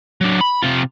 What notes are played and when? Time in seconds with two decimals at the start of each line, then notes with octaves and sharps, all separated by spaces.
0.21 F#3 D4
0.41 B5
0.62 C3 F4